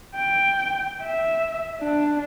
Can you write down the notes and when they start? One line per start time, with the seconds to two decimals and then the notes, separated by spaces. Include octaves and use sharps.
0.16 G5
1.02 E5
1.80 D4